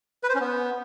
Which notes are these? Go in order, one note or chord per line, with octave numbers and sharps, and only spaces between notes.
B4
C5
C#4
B3